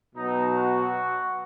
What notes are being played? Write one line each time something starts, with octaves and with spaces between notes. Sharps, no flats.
B2 F#3 D#4
F#4